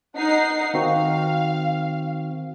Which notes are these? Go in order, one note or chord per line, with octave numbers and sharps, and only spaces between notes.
D#4 F#5 C7
D#3 C4 F#4 F5